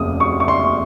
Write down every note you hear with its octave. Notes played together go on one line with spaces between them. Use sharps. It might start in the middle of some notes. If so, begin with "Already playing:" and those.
Already playing: F1 D#2 C#3 D#6
C#6
C#6
C6